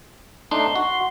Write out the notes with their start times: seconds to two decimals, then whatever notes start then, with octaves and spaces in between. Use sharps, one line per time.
0.51 A3 D4 D#4 C6
0.76 F#4